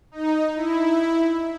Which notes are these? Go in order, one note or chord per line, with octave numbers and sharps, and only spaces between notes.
D#4
E4